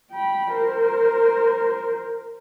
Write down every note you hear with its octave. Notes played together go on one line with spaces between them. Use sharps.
G5 B5
A#4 C5